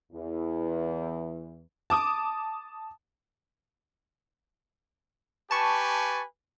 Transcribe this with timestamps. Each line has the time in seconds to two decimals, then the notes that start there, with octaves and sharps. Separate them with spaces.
0.12 E2 E3
1.90 A5 D6 D#6
5.51 G4 B4 G#5 A5 C#6